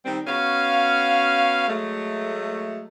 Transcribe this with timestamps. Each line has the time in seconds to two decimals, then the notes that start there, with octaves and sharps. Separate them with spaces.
0.05 D#3 G3 C4
0.27 B3 C#4 F#4 F5
1.68 F#3 G#3 A3